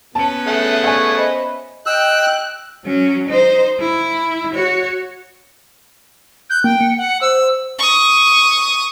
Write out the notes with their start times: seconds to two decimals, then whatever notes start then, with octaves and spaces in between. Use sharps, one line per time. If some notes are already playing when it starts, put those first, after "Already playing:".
0.15 B3 C#4 B4 A5 C#7
0.47 A3 G#4 E5 F#5
0.84 D5 E5 G#5 C#6 G#6
1.16 C5 D#5 B5
1.86 D#5 G5 E6 F#6
2.85 F#3 C#4
3.28 D#4 C5
3.80 E4
4.53 F#4 C#5
6.50 F#6 G6
6.64 A#3 G5
6.81 C#7
6.98 F#5
7.21 C5 E6
7.79 C#6 D#6